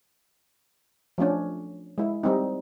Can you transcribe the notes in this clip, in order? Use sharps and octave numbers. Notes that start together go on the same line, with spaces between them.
F3 A3 C#4 D4
G#3 E4
G3 C4 D#4